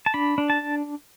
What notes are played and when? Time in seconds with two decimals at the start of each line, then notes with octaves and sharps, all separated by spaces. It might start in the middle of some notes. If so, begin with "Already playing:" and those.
0.06 A5
0.14 D4 B5
0.38 D4
0.50 A5